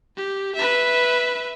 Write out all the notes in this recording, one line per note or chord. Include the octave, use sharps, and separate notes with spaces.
G4
B4 E5